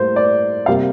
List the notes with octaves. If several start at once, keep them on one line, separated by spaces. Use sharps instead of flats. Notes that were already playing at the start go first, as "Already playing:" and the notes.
Already playing: A2 G3 A#3 C5
D5
C3 G3 A#3 F5